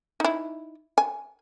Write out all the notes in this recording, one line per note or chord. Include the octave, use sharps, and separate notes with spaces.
D#4 E4
G#5